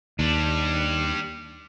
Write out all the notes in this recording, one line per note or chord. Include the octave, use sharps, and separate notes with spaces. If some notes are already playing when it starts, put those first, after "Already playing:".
D#2 G3 D4